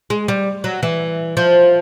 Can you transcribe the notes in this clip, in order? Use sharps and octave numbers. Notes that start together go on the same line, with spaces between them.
G#3
G3
F#3
E3
F3